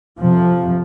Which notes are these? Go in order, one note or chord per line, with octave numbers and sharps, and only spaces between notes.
F2 C3 F3